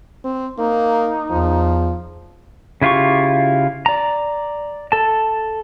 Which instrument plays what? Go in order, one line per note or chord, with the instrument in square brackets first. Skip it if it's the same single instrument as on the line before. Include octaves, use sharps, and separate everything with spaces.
[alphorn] C4
[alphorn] A#3 [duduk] D#4
[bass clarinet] E2 [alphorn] F3
[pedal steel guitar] C#3 E4 F4 G4 C#6
D5 A#5
A4 A5